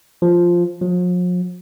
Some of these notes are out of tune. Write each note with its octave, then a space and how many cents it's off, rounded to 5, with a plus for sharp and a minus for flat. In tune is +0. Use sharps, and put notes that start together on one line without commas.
F3 +0
F3 +45